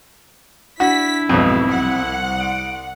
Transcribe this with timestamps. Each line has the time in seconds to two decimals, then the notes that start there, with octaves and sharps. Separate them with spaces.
0.80 D4 E4 F#4 B6
1.29 B1 F2 G#2 B2 C4
1.72 C2 F#5
2.40 D7